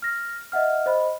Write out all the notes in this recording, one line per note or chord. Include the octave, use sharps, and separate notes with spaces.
F6 A#6
D#5 E5 F#5 F6
C5 D#5 B5